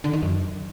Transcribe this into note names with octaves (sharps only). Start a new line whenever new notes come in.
D3
D#3
F#2